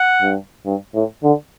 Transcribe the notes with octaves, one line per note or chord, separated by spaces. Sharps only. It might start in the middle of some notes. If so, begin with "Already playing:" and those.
Already playing: F#5
G2
G2
A2
D3